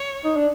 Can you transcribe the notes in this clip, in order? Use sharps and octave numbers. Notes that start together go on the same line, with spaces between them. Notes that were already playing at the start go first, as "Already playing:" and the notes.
Already playing: C#5
D#4
D4